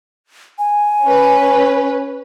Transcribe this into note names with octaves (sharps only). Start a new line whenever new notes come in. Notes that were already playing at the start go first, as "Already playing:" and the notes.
G#5
C#4 B4